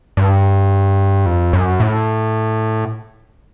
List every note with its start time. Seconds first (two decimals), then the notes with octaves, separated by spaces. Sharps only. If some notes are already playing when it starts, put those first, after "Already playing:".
0.17 G2
1.26 F2
1.53 F#2
1.80 A2